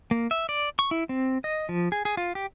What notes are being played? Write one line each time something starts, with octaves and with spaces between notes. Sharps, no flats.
A#3
E5
D5
C#6
E4
C4
D#5
F3
G#4
G#4
F4
G4